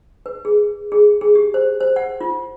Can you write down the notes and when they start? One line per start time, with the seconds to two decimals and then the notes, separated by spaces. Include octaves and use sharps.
0.26 B4
0.45 G#4
0.92 G#4
1.21 G#4
1.35 G4
1.54 C5
1.80 C5
1.96 F#5
2.21 F4